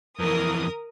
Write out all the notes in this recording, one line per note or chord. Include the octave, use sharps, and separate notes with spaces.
F2 E3 A#4 D#6